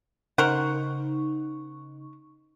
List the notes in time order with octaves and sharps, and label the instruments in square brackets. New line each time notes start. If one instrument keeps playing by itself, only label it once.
[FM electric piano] C#3 D#4 C#6 [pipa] A#4 C5 F#5